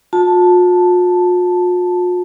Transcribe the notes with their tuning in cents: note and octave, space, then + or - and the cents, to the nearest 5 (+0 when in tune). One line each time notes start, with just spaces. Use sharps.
F4 +45 A5 +0